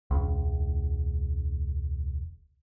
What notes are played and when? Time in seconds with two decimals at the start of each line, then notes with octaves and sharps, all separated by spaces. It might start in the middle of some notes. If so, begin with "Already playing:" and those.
0.11 E1 C#2